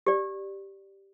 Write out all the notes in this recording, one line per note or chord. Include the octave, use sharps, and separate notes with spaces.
G4 D5